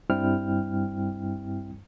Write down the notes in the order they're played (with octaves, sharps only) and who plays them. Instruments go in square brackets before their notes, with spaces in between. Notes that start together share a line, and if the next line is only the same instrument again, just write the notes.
[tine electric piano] G2 G3 C4 E4 G5 F6